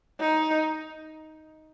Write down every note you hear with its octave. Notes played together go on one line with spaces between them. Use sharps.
D#4